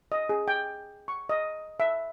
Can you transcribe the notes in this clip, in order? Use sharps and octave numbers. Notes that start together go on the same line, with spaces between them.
D#5
G#4
G5
C#6
D#5
E5